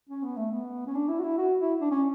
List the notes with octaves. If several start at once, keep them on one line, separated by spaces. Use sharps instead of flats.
C#4
B3
A3
B3
C#4
D4
E4
F#4
E4
F#4
E4
D4
C#4